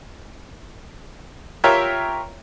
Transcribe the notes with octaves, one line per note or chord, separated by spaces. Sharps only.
F4 G4 A#4 C#5 E5 G5